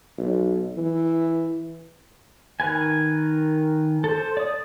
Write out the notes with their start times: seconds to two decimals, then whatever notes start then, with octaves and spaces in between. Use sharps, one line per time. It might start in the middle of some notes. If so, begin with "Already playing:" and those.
0.18 B1
0.78 E3
2.60 D#3 A#4 B4 G#5
4.04 A4 C5
4.37 D5 D#6